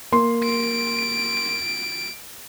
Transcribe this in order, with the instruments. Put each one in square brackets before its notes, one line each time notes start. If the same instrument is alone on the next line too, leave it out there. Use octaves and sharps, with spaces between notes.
[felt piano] A#3 C6
[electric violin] D7